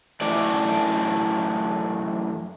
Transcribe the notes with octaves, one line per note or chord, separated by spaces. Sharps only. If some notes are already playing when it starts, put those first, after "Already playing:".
F#2 E3 A3 D5